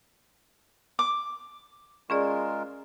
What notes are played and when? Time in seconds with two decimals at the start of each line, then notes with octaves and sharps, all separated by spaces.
0.99 D6
2.10 G#3 C#4 F4 G#4 A#4 D5